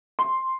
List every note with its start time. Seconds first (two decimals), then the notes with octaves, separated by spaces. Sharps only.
0.19 C6